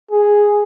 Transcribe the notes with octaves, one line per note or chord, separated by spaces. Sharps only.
G#4